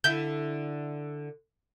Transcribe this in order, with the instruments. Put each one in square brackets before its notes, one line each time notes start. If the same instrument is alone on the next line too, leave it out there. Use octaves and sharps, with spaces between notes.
[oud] D3 E4 E5 [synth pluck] G6